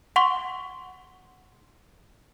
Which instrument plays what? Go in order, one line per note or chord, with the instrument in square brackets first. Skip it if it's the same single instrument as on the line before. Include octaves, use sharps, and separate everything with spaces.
[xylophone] F#5 C6 C#6